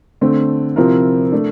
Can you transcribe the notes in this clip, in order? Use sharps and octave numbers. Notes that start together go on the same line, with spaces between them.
D3 A3 C4
C3 F3 C4 E4 A#4
A3 D4